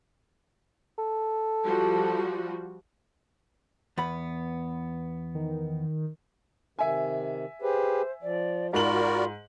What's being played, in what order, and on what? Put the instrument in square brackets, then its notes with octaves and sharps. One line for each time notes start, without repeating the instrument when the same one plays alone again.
[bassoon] A4
[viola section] F3 G3 F#4
[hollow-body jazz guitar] E2 B3 B5
[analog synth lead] D#3
[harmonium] C3 D#3 [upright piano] E5 G#5
[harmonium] G4 G#4 B4 [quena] C5
[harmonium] F3 [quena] D5
[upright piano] G#2 F#7 [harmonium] F4 [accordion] F#4 A#4 D5 [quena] B5